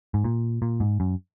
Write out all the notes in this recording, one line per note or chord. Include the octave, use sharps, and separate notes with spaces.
G#2
A#2
A#2
G#2
F#2